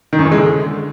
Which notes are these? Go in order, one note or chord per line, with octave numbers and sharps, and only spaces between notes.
D#3
F#2
E3
G#3
D3